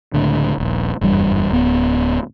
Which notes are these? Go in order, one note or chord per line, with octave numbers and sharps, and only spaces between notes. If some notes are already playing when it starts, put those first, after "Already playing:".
C#2 A2 D3
D#1 A#1
F#1 E2 G2 G3
D1 B3